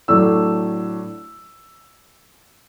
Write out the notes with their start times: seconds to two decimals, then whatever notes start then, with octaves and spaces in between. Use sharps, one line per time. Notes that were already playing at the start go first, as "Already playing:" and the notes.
0.08 A2 F#3 A3 D4 E6